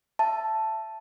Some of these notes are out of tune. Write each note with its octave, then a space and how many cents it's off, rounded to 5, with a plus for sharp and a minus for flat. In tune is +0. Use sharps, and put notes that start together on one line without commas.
E5 +15 A5 +0